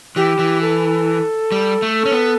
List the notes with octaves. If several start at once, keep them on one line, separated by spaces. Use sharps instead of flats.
E3 G4
E3
A4
G3
A3
C#4
B3